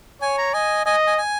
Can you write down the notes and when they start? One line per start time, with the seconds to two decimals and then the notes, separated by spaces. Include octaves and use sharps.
0.21 C#5 G#5
0.38 A#5
0.53 D#5 G#5
0.86 D#5 G#5
1.07 G#5
1.18 G#5